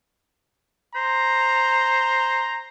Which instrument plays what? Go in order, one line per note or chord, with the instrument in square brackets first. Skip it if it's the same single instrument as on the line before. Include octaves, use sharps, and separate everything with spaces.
[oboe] C5 [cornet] A#5